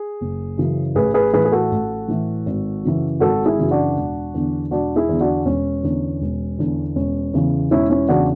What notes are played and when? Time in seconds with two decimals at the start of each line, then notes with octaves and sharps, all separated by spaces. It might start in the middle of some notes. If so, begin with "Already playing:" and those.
Already playing: G#4
0.21 F#1
0.57 F#2 C#3 E3
0.95 A1 G#4 B4
1.14 G#4 B4
1.33 A2 E3 G#4 B4
1.45 G#4
1.52 F#4 A4
1.71 A1
2.08 A2 E3
2.46 G#1
2.83 F#2 C#3 E3
3.20 G#1 F#4 A4
3.46 E4 G#4
3.58 F#2 C#3 E3
3.71 D4 F#4
3.96 E1
4.34 E2 D3
4.71 E1 D4 F#4
4.96 E4 G#4
5.09 E2 D3
5.20 D4 F#4
5.46 E1 C#4
5.83 E2 D3
6.22 E1
6.59 E2 D3
6.96 E1 C#4
7.34 E2 C#3 E3
7.71 E1 C#4 E4
7.90 C#4 E4
8.08 E2 C#3 E3 D4 F#4